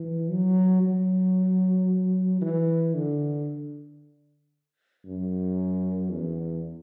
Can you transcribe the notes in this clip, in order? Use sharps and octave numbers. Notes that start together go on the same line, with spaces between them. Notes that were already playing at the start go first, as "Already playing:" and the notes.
Already playing: E3
F#3
F#3
E3
D3
F#2
E2